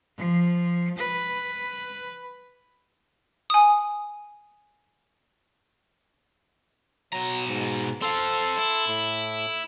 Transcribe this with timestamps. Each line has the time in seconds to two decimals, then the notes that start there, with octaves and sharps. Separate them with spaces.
0.17 F3
0.98 B4
3.50 G#5 D#6
7.12 B2 F#3 A#5
7.47 G#2
8.02 C4 A4 F5 C6
8.58 E4
8.87 A2